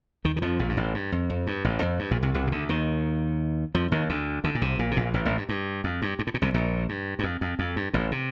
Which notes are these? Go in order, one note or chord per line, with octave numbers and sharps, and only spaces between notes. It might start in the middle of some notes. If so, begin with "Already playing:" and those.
D#2 D#3
D#3
F2 F3
A#1 A#2
G2
A1 A2
G2
F2
F2
G2
A1 A2
F2
G2
A#1 A#2
C2 C3
C2 C3
C3
D2 D3
D#2 D#3
F2 F3
D#2 D#3
D2 D3
D2 D3
A#2
C2 C3
A#1 A#2
C3
A#1 A#2
A1 A2
A1 A2
G2
G2
F2
G2
G2
A2
A#2
C2 C3
A#1 A#2
G2
G2
F2
F2
F2
G2
A1 A2
C3